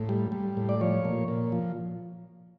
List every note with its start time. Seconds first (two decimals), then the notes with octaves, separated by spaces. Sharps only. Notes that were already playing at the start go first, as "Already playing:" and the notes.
Already playing: A2
0.09 G3
0.32 G3
0.57 A2
0.69 D5
0.81 F3 C#5
1.05 A#2
1.28 A#2
1.52 F3